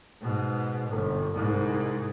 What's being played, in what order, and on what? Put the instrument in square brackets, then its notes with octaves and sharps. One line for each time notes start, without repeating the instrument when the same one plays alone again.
[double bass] G#2 B2
G1
C2 G#2